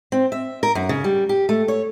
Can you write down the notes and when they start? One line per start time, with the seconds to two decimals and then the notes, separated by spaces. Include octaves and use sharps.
0.12 C4
0.32 E5
0.63 A#4
0.75 F#2
0.89 C#3
1.04 G3
1.29 G4
1.49 A3
1.68 C#5